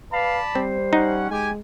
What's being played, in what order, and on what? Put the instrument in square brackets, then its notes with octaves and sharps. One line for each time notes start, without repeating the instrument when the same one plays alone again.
[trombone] B4 [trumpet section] D5 A5 B5 [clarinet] F5
[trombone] G3 [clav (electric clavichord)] C4 [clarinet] C5
[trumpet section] C#4 F#5 [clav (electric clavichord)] D#4
[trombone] G#3 [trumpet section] G4 G#5